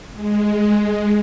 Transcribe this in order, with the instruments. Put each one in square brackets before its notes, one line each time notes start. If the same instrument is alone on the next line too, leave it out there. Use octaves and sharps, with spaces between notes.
[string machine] G#3